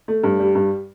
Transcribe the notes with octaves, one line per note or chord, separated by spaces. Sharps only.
A3
G2
G3
G2